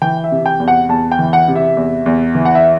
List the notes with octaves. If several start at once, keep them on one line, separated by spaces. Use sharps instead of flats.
E3 G5
E5
C3
G5
E2
F#5
E2 A5
G5
E3
F#5
C3
E5
E2
E2
E3
F#5
E5